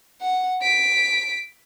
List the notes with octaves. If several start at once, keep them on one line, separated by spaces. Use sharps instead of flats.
F#5
B6 D7